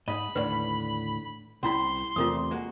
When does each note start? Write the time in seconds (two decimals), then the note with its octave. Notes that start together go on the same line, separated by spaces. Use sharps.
0.08 G#2 D#5 B5
0.35 D#2 A2 D3 B4 D5
1.63 C2 C#4 E4 B5 C6
2.16 E2 C3 A3 F4 A#4 D#6
2.51 G#3 A#3 F#4